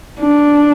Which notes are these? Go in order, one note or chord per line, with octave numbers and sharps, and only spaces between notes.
D4